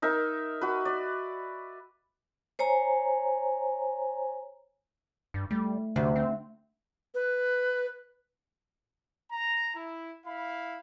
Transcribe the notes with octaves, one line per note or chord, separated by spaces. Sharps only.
D#4 A#4 E5
F#4 B4
D5
C5 C#5 G#5 A#5
G2
G3 A3
D2 C3
C4
B4
A#5
E4
E4 F5 B5